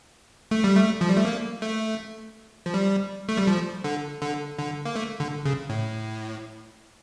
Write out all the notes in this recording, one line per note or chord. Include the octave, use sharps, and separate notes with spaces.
A3
G3
A3
F3
G3
A3
A#3
A3
F3
G3
A3
G3
F3
D3
D3
D3
A#3
A3
D3
C#3
A2